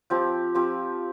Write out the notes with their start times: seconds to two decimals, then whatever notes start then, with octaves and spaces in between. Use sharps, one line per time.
0.10 F3 C4 G4
0.55 F3 C4 G4